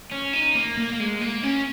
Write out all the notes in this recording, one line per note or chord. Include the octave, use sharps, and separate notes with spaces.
C#4
D#4
A#3
A#3
A#3
G#3
A#3
C#4